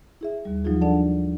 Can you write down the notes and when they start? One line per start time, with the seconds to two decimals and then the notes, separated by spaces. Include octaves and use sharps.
0.21 E4 G#4 E5
0.45 D#2 G3
0.64 F3 F#3 D#4 F4 G#4
0.81 D4 A4 D5 F#5 A5